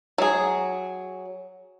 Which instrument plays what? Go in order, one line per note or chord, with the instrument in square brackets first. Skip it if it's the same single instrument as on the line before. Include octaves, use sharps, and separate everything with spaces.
[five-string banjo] F#3 G#4